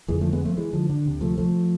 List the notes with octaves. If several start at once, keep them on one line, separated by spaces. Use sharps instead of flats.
F2 D3 E3 G#3
F3 A3
G#3 B3
F3 A3
E3 G#3
D3 F3
D3
D2 C3
F3 A3
F3 A3